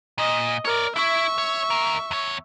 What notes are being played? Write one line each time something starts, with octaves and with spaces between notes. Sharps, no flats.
A#2 D#5
A#4 C#5 D5
E4 E5 C#6
C#5
D#2 A#4
E2 C#5